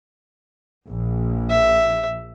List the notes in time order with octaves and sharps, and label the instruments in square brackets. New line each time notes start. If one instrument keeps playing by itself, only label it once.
[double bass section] A#1
[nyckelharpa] E5